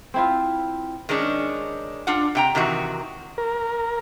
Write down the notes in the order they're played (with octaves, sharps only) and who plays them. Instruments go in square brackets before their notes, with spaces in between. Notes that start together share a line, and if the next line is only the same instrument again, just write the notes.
[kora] C4 E4 F4
[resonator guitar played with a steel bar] D#3 G#3 C#4 D4
D4 F4 F#5
C3 G5 A#5
C3 D#3 E3 F#4
[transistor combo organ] A#4